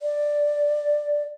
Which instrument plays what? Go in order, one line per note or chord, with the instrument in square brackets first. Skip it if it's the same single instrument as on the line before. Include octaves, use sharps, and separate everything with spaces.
[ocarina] D5